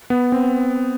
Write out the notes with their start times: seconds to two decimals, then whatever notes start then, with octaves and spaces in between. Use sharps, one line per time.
0.10 B3
0.32 C4